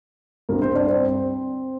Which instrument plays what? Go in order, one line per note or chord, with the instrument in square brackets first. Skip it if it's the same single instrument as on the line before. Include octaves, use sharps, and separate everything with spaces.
[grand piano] G2 D3 G3 A#3 C4 A#4
C4 C5
D4 D5
C4 C5